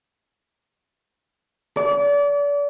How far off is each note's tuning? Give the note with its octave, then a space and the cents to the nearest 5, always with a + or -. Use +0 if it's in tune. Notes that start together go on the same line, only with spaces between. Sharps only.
D5 -35